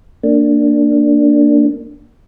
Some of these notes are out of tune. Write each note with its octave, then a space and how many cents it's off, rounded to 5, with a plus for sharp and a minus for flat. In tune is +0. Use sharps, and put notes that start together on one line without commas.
A#3 -20 D4 +0